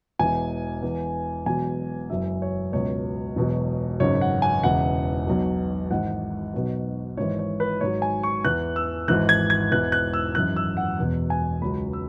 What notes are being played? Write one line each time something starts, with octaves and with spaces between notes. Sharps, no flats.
E1 E2 E3 G#5
E2 E3
E1 E2 B2 F#3 G#5
F#1 F#2 F#3 E5
C#5
C#2 B2 F#3 C#5
E1 E2 B2 F#3
G#1 F#2 C#3 C#5
F#5
G#5
E1 E2 C#3 E3 F#5
B1 B2 F#3
G#1 G#2 E3 F#5
B1 B2 F#3
G#1 G#2 E3 C#5
C#5
B4
G#1 G#2 F#3 C#5
G#5
C#6
E2 E3 F#6
E6
G#1 G#2 E3 F#6
G#6
G#6
E1 E2 E3 F#6
F#6
E6
G#1 F#2 E3 F#6
E6
F#5
E1 E2 B2
G#5
C#2 C#3 F#3 B5
E6